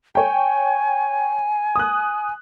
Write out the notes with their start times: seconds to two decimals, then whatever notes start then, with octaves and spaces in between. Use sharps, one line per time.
0.15 C#5 G5 G#5
1.76 D#6 F#6